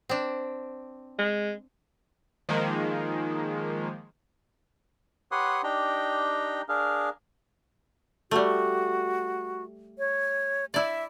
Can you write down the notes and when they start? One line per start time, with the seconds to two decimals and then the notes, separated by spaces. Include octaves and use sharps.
0.09 C4 D4
1.18 G#3
2.49 D#3 F3 G#3 A#3
5.32 G4 B4 C#5 F#5 C6 D#6
5.64 D4 D#4 G4 G5 A#5
6.69 D4 G#4 A#4 F5
8.31 G3 A3 F#4
9.98 C#5
10.74 E4 D5 E5